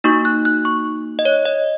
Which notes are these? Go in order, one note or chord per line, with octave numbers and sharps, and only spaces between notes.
A#3 D#4 F#4 C#6
F#6
F#6
C#6
D#5
C#5
D#5